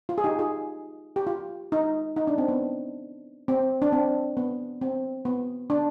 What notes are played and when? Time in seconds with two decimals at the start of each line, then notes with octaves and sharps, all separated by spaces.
0.09 F4
0.18 G#4
0.24 D#4 G4
0.39 F4 G#4
1.16 G4
1.27 F4
1.72 D#4
2.16 D#4
2.27 D4
2.38 C4
2.48 B3
3.48 C4
3.82 D4
3.92 C4
4.37 B3
4.81 C4
5.25 B3
5.70 D4